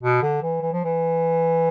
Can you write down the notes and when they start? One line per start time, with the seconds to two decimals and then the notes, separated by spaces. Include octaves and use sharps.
0.03 B2
0.22 D3
0.42 E3
0.61 E3
0.73 F3
0.84 E3